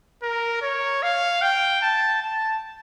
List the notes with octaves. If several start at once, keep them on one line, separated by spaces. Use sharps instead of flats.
A#4
C#5
F5
G5
A5
A5